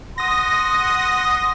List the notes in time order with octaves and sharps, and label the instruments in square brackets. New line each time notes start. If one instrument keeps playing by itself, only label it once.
[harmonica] F#5 C6 [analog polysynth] D#6 A#6